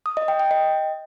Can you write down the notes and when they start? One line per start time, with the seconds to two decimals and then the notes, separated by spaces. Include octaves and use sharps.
0.06 D#6
0.17 D#5
0.28 G5
0.40 G5
0.51 D#5